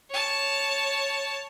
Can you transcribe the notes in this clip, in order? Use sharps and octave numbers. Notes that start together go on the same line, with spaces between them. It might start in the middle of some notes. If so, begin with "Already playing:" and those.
C#5 A5